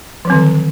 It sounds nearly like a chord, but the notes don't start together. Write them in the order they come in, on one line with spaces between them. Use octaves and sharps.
F3 F#3 C4 D#3 D3